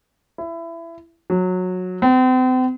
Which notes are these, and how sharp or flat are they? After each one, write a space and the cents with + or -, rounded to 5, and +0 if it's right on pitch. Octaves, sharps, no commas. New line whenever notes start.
E4 +20
F#3 -15
C4 -40